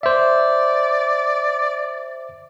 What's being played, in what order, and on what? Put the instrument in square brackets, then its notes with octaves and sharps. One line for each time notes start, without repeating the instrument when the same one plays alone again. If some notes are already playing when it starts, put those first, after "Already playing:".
[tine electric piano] C5 E5 [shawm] D5